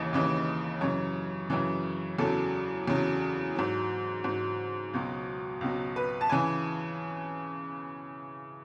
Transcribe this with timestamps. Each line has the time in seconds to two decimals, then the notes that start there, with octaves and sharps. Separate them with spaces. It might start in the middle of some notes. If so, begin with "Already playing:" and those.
Already playing: D#2 C#3 E3 D#5
0.13 D#2 C#3 E3
0.81 F#2 C#3 E3 C#5
1.50 F#2 C#3 E3
2.19 E2 C#3 F#3 A4
2.88 E2 C#3 F#3
3.56 G#2 F#3
4.24 G#2 F#3
4.93 C#2 B2 F#3
5.61 C#2 B2 F#3
5.96 B4
6.21 A5
6.29 C#3 E3 G#5